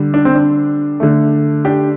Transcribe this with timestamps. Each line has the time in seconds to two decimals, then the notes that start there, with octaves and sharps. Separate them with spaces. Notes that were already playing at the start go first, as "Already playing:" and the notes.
Already playing: D3 G3
0.14 D4
0.25 C4
0.35 D4
1.00 D3 A3
1.65 D4 G4